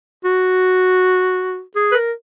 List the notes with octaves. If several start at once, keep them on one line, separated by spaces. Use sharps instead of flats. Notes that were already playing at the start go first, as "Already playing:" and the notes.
F#4
G#4
B4
A#4